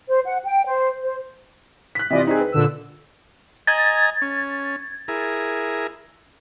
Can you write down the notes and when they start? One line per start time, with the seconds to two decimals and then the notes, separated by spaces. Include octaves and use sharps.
0.09 C5
0.25 F#5
0.43 G5
0.66 C5
1.02 C5
1.95 F#6 B6
2.10 C3 E3 F4 D5 D#5
2.27 C4 D#4 G#4
2.40 B4
2.52 A#2 D3 E6
3.67 D#5 G#5 A#5 G#6 A6
4.22 C#4
5.08 E4 G#4 A#4